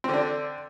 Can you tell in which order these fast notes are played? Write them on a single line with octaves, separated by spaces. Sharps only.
C4 D3 D4